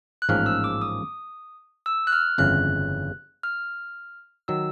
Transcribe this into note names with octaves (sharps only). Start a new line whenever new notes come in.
F#6
A1 G#2 F3 A#3 C#4 F6
E6
D6
D#6
E6
F#6
F6
G1 F2 C#3 E3 F#6
F6
D#3 F#3 E6